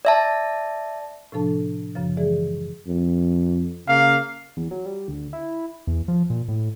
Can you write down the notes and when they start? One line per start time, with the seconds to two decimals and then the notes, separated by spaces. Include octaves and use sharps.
0.05 D5 E5 A5
1.32 A2 C3 F3 D4 A4 A5
1.95 F#2 C#3 F3
2.17 E3 G#3 G#4 D5 E5
2.87 F2
3.88 C#3 A#3 F5
4.57 E2
4.71 F#3
4.86 G3
5.08 D2
5.33 E4
5.87 E2
6.08 F3
6.30 A#2
6.48 A2